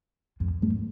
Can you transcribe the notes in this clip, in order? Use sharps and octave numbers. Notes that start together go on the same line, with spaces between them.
F2
G2